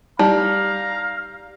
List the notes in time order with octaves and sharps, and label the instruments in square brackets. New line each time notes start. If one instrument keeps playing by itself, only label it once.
[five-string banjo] G3 [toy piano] D#4 [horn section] F5 A#5